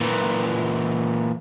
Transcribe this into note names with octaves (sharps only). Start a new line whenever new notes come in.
A#2 E3